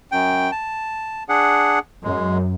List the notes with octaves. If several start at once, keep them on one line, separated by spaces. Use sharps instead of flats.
F#2 G5
A5
D4 G#4 F#5
F#2 G#3